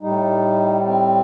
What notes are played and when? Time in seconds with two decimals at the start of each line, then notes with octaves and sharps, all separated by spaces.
0.01 A2 G3 D#4
0.87 C4